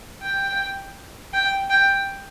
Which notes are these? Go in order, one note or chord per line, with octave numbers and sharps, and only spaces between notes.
G5
G5
G5